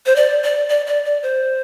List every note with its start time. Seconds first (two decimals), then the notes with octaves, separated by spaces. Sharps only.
0.06 C5
0.16 D5
0.43 D5
0.69 D5
0.87 D5
1.05 D5
1.23 C5